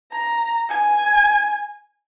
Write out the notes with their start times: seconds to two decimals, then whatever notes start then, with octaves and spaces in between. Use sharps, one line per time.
0.12 A#5
0.69 G#5